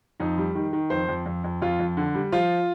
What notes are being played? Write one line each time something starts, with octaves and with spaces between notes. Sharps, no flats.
F2 D#4
G3
D#3
D#3
F2 C5
F2
F2
F2
F2 F4
F2
D3
G3
F3 F4